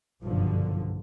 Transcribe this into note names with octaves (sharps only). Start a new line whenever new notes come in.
F#1 B1 G2 D3 F3